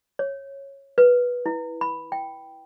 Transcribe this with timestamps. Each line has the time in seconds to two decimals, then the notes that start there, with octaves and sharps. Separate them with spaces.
0.19 C#5
0.98 B4
1.46 E4
1.81 B5
2.12 G5